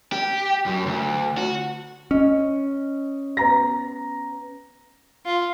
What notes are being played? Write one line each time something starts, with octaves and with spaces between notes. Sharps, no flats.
G4
F#2
D2
F#4
C#4 D#5
B3 A#5 A#6
F4